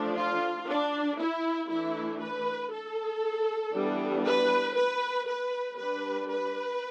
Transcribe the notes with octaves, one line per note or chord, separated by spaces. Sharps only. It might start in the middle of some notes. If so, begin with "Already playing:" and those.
Already playing: F3 A3 D4
F4
D4
E4
E3 A3 D4 E4
B4
A4
E3 G3 B3 D4
B4
B4
B4
G3 D4 B4
B4